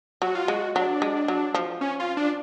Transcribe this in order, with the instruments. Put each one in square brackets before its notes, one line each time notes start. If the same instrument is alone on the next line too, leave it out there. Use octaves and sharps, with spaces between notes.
[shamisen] F#3 [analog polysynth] F#4
[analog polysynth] F4
[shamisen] G#3 [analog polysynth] F#4
[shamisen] F#3 [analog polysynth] D4
[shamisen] G#3
F#3
F3
[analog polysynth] C#4
F4
D4